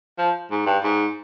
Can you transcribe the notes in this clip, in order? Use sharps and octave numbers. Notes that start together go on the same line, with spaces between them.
F3
G#2
G2
G#2